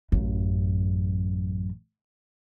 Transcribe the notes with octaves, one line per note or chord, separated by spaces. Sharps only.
A1 F#2